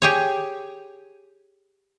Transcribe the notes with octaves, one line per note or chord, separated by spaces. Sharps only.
G4 G#4 C#5